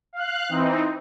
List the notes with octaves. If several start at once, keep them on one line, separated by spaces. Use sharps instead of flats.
F5 F#6
E3 C4 D#4